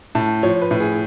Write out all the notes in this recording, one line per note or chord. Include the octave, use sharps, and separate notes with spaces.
A2 A5
F3 C#5
B4
A2
G#4